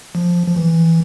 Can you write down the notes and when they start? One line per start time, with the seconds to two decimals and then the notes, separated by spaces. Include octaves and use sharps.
0.15 F3
0.48 F3
0.56 E3